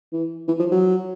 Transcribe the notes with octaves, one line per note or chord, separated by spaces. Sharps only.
E3
E3
F3
F#3